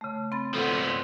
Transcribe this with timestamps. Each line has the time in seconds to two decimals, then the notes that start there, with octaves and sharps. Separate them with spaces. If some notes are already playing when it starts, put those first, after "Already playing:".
0.01 C#3 A3
0.32 C4 B5 A6
0.54 F3 B3 C4 A4